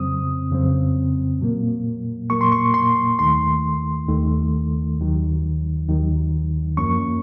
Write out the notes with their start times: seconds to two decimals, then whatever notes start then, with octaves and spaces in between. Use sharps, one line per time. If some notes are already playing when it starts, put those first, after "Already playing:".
Already playing: F2 C#3 F#3 C4 D#6
0.51 F2 C#3 F#3 C4
1.40 A#2 F#3 A#3
2.30 A#2 F#3 A#3 C#6
2.41 C6
2.52 C#6
2.74 C6
3.19 D#2 D#3 A3 C6
4.09 D#2 D#3 A3
4.99 D#2 D#3 F#3
5.88 D#2 D#3 F#3
6.77 F#2 F3 A#3 C#4 C#6